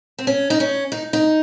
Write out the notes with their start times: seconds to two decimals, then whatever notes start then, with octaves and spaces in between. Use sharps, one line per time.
0.19 C4
0.27 C#4
0.50 D#4
0.60 C#4
0.92 D#4
1.13 D#4